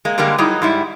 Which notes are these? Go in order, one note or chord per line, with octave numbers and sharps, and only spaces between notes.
G#3 A#3
D3 G3 G#3 A#3 G4
F#3 G3 D#4 E4 G#4
G#2 G3 E4